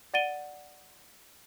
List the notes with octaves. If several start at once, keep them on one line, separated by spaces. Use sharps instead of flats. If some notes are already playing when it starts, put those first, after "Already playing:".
D5 F#5 A6 D7 D#7 G7